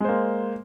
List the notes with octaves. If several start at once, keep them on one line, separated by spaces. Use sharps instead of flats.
G#3 A#3 C5